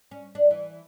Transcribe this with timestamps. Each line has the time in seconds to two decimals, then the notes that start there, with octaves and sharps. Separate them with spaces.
0.11 C#4
0.35 D4
0.51 E3